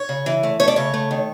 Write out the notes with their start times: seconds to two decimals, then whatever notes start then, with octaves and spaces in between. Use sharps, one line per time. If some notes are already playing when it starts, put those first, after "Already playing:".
Already playing: C#5
0.09 C#3
0.26 E3
0.43 A3
0.60 A3 C#5
0.68 D5
0.76 C#3 C#5
0.94 A3
1.11 D#3